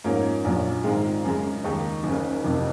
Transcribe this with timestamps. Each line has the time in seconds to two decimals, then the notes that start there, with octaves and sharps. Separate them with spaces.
0.04 G#2 F3 A#3 C#4
0.44 A#1 A#2 F#3
0.84 G#2 D#3 G#3 C4 F4
1.24 F#2 C#3 G#3
1.64 D#2 D#3 G#3 D#4
2.04 F#1 F#2 C#3
2.44 F#1 F2 C3